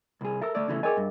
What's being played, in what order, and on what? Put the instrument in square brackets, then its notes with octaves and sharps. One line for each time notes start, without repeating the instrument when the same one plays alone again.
[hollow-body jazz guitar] C2 G#4
[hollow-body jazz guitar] A4 A#4 [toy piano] E5 E6
[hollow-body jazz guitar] A3 D5 [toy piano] E6
[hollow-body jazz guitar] C#3 E3 A3
[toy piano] G#4 A#4 D#5 [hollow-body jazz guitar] C#5 G5 G#5
[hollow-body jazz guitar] G2